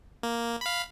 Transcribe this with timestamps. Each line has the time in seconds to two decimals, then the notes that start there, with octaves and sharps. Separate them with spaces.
0.23 A#3
0.61 F5 B5